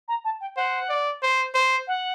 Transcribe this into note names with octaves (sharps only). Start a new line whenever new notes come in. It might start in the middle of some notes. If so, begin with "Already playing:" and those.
A#5
A5
G5
C5 F#5
D5
C5
C5
F#5